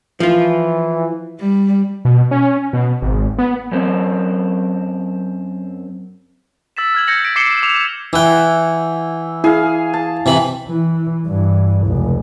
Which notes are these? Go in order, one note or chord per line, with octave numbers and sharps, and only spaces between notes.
E3 F3 F4
G3
B2
C#4
B2
G#1
B3
F#2 C4
E6 A6 B6 E7
F6 G#6 F#7
G6 G#6 A#6 C#7 F#7
B6 D7
D6 C7 C#7 E7 G7
D6 C7 F7
E3 E4 F#5 G5
E4 G#4 F5
A5
C3 E3 B5
E3
G2 E3
F1 C#2